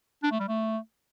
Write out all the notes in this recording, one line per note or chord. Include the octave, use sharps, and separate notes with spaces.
D4
A3
G3
A3